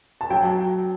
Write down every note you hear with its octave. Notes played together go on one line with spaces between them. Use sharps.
A5
F#3 G5